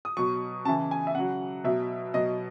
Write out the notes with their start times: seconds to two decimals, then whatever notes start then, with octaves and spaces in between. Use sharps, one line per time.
0.05 D#6
0.17 B2 F#3 C#6
0.65 C#3 E3 A5
0.91 G#5
1.07 E5
1.15 C#3 F#3 F#5
1.64 B2 F#3 E5
2.14 B2 F#3 D#5